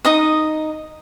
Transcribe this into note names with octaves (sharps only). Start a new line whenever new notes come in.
D#4 D#5 D#6